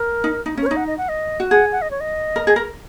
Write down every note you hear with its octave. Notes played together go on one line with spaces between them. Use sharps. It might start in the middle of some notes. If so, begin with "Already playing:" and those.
Already playing: A#4
D#4
D#4
C#4 A#4
C#5
D#4
F#5
D#5
F#5
D#5
F#4
G#4 F#5
F#5
D#5
C#5
D#5
A#4
G#4
A#4